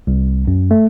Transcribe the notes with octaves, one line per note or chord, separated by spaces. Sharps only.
C2
F#2
A3